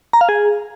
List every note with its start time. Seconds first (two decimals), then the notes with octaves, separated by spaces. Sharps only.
0.13 A#5
0.21 F5
0.29 G#4